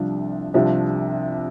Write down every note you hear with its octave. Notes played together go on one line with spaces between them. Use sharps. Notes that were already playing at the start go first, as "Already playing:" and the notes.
Already playing: C2 C3 F3 D4
C2 C3 F3 D4